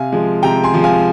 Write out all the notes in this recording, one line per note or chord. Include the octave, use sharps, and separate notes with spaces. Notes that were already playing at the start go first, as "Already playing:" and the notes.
Already playing: C3 F5 G#5
F3 G#3
C3 G5 A#5
G#5 C6
F3 G#3
F5 G#5